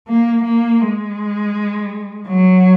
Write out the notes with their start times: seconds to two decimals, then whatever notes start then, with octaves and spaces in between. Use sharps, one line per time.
0.08 A#3
0.44 A#3
0.81 G#3
2.27 F#3